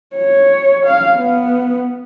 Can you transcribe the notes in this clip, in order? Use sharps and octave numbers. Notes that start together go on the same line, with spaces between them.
C#5
F5
B3